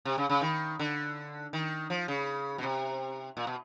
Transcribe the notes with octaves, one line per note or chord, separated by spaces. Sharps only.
C3
C#3
C#3
D#3
D3
D#3
F3
C#3
B2
C3
A#2
B2